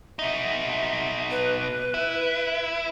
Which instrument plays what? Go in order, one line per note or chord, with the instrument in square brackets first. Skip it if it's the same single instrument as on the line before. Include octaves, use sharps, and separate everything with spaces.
[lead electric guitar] B2 D#4 [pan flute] E5
[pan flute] B4
[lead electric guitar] E4